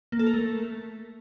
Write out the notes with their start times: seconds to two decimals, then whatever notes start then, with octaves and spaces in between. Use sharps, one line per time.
0.12 A#3
0.19 A4
0.26 A#4
0.34 A3